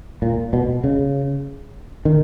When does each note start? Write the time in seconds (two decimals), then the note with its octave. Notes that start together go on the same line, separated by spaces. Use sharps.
0.22 A#2
0.53 B2
0.84 C#3
2.05 D#3